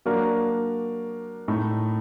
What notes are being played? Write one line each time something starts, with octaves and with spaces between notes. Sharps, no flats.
F#3 A#3 D4 F#4 A#4
A2 A3 D#4